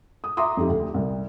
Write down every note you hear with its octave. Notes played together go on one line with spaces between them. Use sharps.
D#6
E5 A#5 C6 D6 D#6
F2 D#4 G4
D2
C2